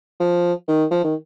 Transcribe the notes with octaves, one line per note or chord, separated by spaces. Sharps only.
F3
D#3
F3
D#3